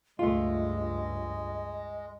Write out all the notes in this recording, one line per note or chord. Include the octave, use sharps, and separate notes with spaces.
C#2 G2 G#3 A3 F4 D#5